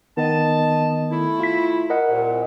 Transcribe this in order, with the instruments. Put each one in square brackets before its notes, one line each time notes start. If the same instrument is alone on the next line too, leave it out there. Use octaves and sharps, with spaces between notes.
[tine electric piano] D#3 B3 [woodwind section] D#5 A5
[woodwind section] A3 E4
[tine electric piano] F4 B6
A#4 D#5 F#5
[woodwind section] C2 A#2